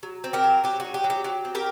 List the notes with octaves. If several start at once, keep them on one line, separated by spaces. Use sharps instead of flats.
F#3
C4
G4 A#4
F#3
F#3 G4
D#4 F#4
G4
F#3
G4
F#3 G4
C4
G4 A#4